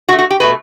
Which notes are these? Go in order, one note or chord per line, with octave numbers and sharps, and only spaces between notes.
D3 F#4
A3
F#4
G4
B2 A3 B4